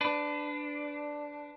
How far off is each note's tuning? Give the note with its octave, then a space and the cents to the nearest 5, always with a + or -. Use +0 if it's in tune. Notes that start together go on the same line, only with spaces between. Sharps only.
D4 +0 B4 +25